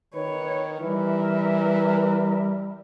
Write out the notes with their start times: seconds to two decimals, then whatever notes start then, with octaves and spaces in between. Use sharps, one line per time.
0.15 D#3 B4 C#5
0.81 E3 G3 A#4 B4 E5